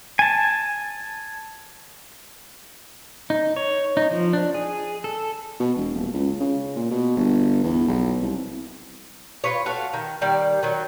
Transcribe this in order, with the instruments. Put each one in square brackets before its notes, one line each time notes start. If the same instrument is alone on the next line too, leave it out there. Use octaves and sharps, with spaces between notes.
[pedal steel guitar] G#5 A5
D#4
C#5
D#4
F3
D4
G#4
A4
[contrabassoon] B2
E1
D#1
C#2
C#3
A#2
B2
G1
E2
B1
C2
[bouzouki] F4 B4 C#5
A3 F#4 F5
D#3
D#3 G3 D5
D#3 F#3